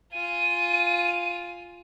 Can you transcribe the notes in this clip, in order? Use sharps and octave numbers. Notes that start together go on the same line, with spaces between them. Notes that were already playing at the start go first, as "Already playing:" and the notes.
F4 G#5 D#7